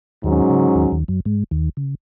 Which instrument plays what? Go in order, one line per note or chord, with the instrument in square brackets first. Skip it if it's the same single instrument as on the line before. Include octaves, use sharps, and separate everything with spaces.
[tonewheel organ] D#2 D#3 [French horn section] G#2 F#3 C#4
[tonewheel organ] C#3
D#2 D#3
D#2 D#3
F#2 F#3
G#2 G#3
D#2 D#3
C#3